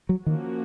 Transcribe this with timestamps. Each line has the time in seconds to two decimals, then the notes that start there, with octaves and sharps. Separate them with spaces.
0.09 F#3
0.26 D#3 F3 A#3 C#4 F#4